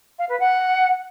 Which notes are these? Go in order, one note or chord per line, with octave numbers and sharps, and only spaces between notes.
F5
B4
F#5